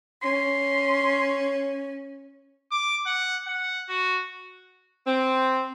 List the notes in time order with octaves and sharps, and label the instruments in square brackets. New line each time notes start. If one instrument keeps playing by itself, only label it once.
[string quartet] C#4 [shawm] C6
[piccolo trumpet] D6
F#5
F#5
F#4
[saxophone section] C4